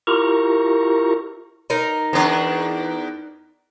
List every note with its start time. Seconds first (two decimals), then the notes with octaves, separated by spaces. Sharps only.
0.07 E4 F4 G4 A#4 A#5 C#6
1.70 D#4 A#4
2.13 E2 D4